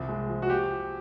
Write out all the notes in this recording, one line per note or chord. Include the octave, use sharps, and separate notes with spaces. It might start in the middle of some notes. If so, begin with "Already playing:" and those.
Already playing: C2 F3
G#3
F3
F#4
G4